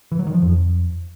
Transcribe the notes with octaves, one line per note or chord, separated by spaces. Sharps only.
E3
F#3
D#3
F3
F2